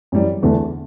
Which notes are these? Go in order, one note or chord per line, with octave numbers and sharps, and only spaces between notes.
F#2 E3 G3
E2 D3 A3